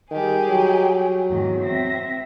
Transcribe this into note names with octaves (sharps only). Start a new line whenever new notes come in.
D#3 G3 G4 G#4
F#3
E2 G#2 D#3
C4 E5 A#6